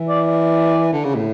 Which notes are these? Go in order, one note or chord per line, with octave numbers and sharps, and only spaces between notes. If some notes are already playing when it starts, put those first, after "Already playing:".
Already playing: E3
D5
D5
D3
C#3
A2